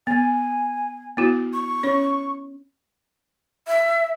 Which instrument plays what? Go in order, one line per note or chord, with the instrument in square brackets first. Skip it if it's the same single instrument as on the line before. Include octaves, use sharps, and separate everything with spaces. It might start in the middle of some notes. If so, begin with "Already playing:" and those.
[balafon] B3 [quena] G#5
[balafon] B3 E4 F#4
[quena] C#6
[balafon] C#4 C#5
[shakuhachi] E5